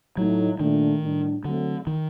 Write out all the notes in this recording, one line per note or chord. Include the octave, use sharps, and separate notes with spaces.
A2 F#3 A3 D#4
A#2 D#3 A3 D4
A2 G3 D4
D3 F#3 A3 C4
D#3